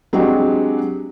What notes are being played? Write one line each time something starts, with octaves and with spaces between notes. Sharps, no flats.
F#3 G#3 C4 D4 F#4 G4